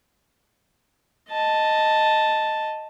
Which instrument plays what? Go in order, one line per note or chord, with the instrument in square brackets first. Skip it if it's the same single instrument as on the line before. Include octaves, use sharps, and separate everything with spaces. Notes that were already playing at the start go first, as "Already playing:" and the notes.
[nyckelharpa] D#5 A5